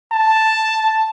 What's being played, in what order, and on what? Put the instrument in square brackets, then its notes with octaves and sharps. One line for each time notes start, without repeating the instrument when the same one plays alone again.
[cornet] A5